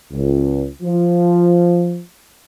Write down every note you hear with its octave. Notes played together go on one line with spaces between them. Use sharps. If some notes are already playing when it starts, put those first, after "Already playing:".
C#2
F3